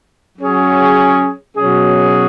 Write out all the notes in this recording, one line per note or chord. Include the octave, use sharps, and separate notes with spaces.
F#3 C#4 G#4 C#5
B2 F#3 C#4 G#4